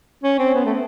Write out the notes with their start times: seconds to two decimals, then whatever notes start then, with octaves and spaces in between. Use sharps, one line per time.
0.23 C#4
0.39 C4
0.55 B3
0.65 A3